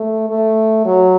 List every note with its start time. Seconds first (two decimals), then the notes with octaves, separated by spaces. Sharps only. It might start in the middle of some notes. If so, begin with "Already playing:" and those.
Already playing: A3
0.29 A3
0.85 F#3